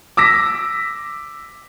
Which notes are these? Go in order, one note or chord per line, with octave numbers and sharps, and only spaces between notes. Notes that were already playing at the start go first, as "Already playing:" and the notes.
D6 E6 A#6 B6